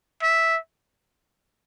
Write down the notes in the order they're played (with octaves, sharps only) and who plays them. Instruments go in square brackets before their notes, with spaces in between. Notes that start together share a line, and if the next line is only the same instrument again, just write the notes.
[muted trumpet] E5